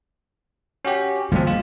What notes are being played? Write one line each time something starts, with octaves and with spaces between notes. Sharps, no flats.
C#4 F#4 G4
F3 G3 G#3 A#3 C4
F4